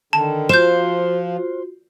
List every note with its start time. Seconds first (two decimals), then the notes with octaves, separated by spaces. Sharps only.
0.13 D3 D#3 A5
0.49 F3 F4 F#4 C5 G6 E7